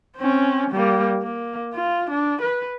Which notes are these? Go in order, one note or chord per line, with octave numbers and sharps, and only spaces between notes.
C4 C#4
G3 A#3
A#3
F4
D4
B4